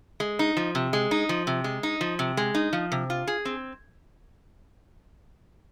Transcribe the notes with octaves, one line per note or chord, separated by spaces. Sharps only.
G#3
D#4
F3
C3
G#3
D#4
F3
C3
G#3
D#4
F3
C3
G#3
D#4
F3
C3
F4
G#4
C4